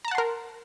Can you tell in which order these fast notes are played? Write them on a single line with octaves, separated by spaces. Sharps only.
A#5 A5 F#5 C6 A#4